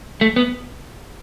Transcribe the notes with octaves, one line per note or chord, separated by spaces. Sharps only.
A3
B3